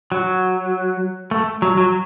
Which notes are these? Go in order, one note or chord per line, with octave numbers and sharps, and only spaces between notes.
F#3
A3
F#3
F#3